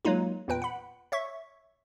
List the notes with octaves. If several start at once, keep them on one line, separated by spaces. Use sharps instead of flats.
F#3 G#3 A#3 D#4 F4
E2 A#2 B4 G5
F#5 B5
C#5 E5 C#6